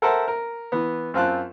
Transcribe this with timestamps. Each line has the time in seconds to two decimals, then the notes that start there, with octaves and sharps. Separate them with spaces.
0.02 A4 A#4 C5 E5 F#5 A5
0.28 A#4
0.72 E3 B3
1.14 F#2 C4 F4 A5 F#6